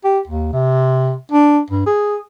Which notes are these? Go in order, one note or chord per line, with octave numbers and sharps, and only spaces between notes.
G4
D#2
C3
D4
G2
G#4